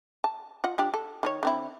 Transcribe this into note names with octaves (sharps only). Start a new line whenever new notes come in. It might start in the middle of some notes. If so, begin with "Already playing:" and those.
A5
F4 D#5 F#5
F3 D4 G4
A4
D#3 D#4 C#5
D3 C4 E4